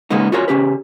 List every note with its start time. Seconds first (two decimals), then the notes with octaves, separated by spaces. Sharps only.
0.10 C#3 G#3 A#3 B3 D#4
0.32 F4 F#4 G#4 A#4 C#5
0.48 C#3 C#4 G4 B4